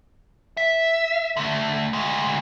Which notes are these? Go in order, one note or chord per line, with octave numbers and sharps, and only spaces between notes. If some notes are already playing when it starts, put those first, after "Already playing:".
E5
D3 A3
D2 G#3